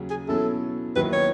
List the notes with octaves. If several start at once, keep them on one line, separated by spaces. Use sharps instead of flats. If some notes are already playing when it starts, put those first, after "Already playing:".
Already playing: D#2 C#3 F#3 C#4
G#4
B2 F#3 C#4 E4 A4
D#2 D#3 F#3 B3 E4 B4
C#5